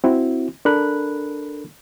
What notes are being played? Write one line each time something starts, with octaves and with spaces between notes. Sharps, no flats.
C4 E4 F#4
D4 A4 A#4 B5 F#6